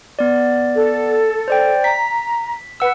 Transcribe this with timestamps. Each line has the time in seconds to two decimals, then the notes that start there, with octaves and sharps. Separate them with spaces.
0.19 B3 D5
0.74 A4
1.48 C5 D5 G5
1.84 A#5 B6
2.80 B4 F#5 E6